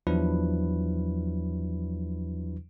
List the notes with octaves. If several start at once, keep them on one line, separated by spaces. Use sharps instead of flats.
E2 F3 F#3 D4 E4 B4